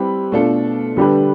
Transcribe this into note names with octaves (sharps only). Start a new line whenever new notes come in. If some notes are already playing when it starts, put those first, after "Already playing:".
Already playing: G3 C4 E4 G4 B4
B2 A3 D4 F4 A4
D3 G3 D4 G4 B4